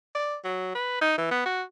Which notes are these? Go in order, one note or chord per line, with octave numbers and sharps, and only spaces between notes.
D5
F#3
B4
D#4
E3
B3
F#4